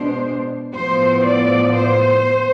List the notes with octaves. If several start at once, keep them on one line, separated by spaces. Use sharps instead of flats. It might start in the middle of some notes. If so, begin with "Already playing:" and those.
Already playing: B2 G#3 B3 D4 C5
A2 F3 B3 C5
D5
C5